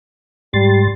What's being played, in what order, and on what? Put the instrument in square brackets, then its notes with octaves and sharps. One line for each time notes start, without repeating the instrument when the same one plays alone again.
[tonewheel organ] G#2 C6 A6 [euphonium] G3